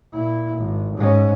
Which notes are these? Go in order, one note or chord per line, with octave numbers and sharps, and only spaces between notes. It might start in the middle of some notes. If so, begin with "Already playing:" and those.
A#2 E4
G#1
G#2 C#4